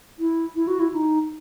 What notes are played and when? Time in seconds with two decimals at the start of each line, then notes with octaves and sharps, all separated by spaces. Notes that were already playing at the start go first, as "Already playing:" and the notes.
0.19 E4
0.55 E4
0.67 F#4
0.80 E4
0.93 D#4